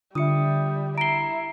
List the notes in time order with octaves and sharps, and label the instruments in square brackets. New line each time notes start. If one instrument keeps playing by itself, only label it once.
[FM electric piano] D3 [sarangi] G3 [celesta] F4 E5 [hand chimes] D#6 C#7
[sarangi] E4 [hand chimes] A#5 C7 [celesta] D7 G7